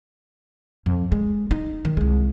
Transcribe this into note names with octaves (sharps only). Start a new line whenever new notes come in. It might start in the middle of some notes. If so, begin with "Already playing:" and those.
F2
G#3
D#4
D#3
C2 G#3